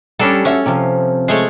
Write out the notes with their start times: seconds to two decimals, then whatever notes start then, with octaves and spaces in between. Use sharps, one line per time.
0.19 G3 C#4 D4 A4
0.45 C#4 F#4 E5
0.66 C3 F3
1.28 G#3 A3 C#5